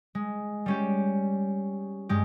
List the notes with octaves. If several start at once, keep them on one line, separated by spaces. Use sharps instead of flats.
G#3
G3 C#4 G4
G2 G#3 G4